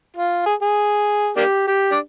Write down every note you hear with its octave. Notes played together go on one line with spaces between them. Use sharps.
F4
G#4
G#4
A#3 D4 G4
G4
D4